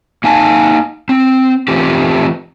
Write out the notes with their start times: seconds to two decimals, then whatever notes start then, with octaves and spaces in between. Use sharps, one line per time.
0.24 A#3 D#4 F5 G#5 A5
1.09 C4
1.68 E3 A3 C4 F4 G4